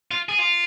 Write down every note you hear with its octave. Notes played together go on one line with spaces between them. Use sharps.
F4
G#4
F4